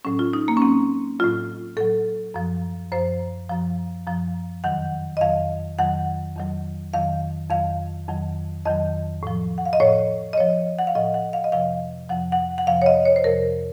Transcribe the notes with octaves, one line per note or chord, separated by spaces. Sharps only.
A2 F#3 C#4
F4
D#4
A#3
C#4
A2 F#3 C4
A2 F#3 F4
A2 F#3 A4
F#2 F3
F#2 F3 C5
F#2 F3
F#2 F3
F2 D#3 F#3 F#5
D#5
F2 D#3 F#3 F5
F2 D#3 F#3 F#5
F2 D#3 F#3
F2 D#3 F#3 F5
F2 D#3 F#3 F5
F2 D#3 F#3
F2 D#3 F#3 D#5
A2 F3
F#5
F5
D#5
A2 F3 C#5
D#5
A2 F3 C#5
F#5
F5
A2 F3 D#5
F#5
F5
D#5
F2 C3 F3 F5
F2 C3 F3 F#5
F#5
F#5
F2 C3 F3 F5
C#5
D#5
C#5
C5
F2 C3 F3 A#4